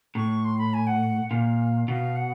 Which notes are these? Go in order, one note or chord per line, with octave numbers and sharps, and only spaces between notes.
A2 C#6
C6
B5
G#5
F#5
A#2 F5
B2 F5
F#5